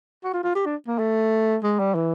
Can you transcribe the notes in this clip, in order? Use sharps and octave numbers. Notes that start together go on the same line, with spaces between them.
F#4
F4
F4
G4
D4
A#3
A3
G#3
G3
E3